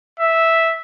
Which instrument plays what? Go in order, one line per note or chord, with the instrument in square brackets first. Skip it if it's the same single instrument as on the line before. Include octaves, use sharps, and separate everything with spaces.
[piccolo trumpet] E5